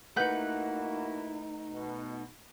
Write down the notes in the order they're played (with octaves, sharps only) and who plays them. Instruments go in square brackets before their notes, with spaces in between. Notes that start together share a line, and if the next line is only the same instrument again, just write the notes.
[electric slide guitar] A3 D#4 [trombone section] A#3 E4 F#4 [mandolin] B4 F#5 G6
[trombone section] B2